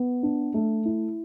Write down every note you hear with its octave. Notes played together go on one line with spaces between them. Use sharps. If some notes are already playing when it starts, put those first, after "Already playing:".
Already playing: B3
D4
A3
E4